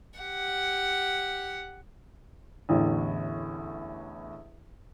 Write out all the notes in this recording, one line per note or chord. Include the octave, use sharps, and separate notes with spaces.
G4 F#5
A1 E2 A2 D3